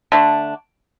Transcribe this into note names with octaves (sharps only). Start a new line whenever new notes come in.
D3 A3 D4